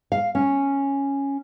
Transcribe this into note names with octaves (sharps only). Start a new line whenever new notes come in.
F5
C#4